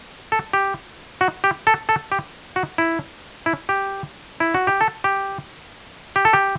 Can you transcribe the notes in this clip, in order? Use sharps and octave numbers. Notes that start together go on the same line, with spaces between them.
A4
G4
F#4
G4
A4
A4
G4
F#4
E4
E4
G4
E4
F#4
G4
A4
G4
G4
A4
G4